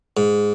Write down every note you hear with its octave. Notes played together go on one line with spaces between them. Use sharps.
G#2